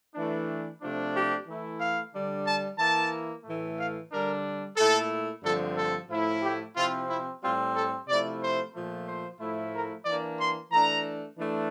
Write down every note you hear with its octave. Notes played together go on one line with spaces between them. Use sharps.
E3 A3 D4
C3 F3 A3 D4
G4
E3 A3 E4
F5
D3 G3 D4
A5
E3 A#3 E4 A5
A2 E3 A3
F5
D3 G3 D4 A#4
A#2 A3 E4 A4
G2 D3 F3 A3 C4 A4
A4
A2 F3 A3 E4
G4
C3 F3 C4 E4 F4
E4
A2 G3 C4 F4
A4
C3 F3 A3 E4 D5
C5
A#2 F3 A3
C5
A2 F3 A3 E4
A#4
E3 A#3 D4 D5
C6
E3 A3 D4 A#5
E3 A3 D4